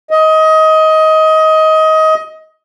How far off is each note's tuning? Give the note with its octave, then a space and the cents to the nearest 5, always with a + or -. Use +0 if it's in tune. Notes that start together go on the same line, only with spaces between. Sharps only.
D#5 +20